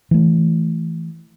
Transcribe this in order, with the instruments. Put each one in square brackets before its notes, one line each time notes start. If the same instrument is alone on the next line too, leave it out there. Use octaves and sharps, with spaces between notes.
[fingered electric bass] E3 A3